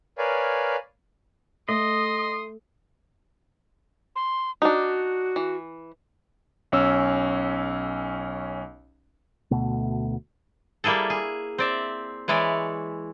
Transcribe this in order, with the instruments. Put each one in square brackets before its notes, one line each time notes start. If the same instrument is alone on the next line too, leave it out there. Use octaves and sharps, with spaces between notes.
[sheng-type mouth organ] A#4 B4 C#5 D5 F5 G#5
[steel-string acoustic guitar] A3 [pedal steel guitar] D#5 [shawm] C6 [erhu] D#6
[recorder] C6
[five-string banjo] D4 D#4 [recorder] F#4
[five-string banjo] E3
[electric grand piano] B1 C#4 E6
[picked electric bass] D2 B2 A3
[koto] G3 A#3 E4 G#4 A4
G#4
C4 D5 E5
E3 G#3 E4 C#5 D5